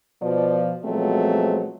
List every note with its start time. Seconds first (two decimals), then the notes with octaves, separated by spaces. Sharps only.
0.22 B2 F3 D5
0.84 B2 F3 F#3 G#3 A3 C4